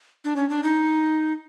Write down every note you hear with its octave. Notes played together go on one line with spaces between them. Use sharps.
D4
C#4
D4
D#4